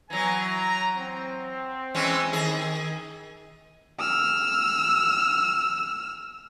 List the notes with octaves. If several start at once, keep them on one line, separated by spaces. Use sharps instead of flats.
E3 F#3 B3 G#5 A#5
A#5
C4
E3 G#3 C#4
D#3 G#4
E6 F6